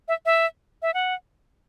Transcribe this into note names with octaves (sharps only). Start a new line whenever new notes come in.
E5
E5
E5
F#5